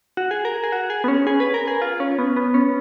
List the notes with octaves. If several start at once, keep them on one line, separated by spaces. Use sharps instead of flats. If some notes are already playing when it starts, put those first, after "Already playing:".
F#4
G#4
A#4
G#4
F#4
G#4
B3
C#4
G#4
B4
A#4
G#4
F4
C#4
B3
B3
C#4